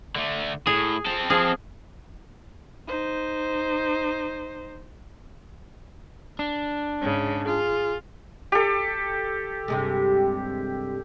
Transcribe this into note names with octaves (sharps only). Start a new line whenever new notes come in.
D3 A3
A2 G#4
C4 A4
F3 G#4
D#4 C5
D4
G#2 C#3
F4 G#4
G4 A4
G2 C3 G#3